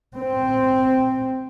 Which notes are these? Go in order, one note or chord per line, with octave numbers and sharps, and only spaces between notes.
C4